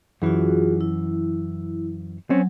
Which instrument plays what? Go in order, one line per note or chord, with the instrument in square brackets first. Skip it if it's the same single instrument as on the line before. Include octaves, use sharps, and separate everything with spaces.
[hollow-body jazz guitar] F#2 E3 [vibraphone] F4 F#4 G#4
[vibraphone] E4
[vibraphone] F#3 [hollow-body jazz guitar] C4 C#4